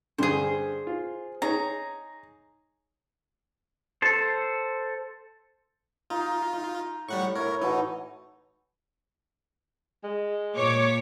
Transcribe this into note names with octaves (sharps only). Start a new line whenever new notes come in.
G2 D3 G#4 C5
F4
D#4 G#4 C#5 A#5
A4 C5
D#4 F4
D#4
A2 G3 F#5 C#6
E4 A#4 C#5
E3 D#4 F#4 A4
G#3
A#2 C#5 D6